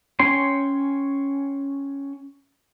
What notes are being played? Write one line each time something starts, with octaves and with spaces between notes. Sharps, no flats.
C#4 C#5 G5 C6